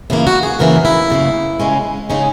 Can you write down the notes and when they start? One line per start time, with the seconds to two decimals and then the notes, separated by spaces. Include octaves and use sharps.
0.10 F#2 C#3 E3 A#3 E4
0.27 F#4
0.43 G#4
0.59 F#2 C#3 E3 A#3 A#4
0.85 E4
1.10 F#2 C#3 E3 A#3
1.60 C#3 G#3 C#4
2.10 C#3 G#3 C#4 D#4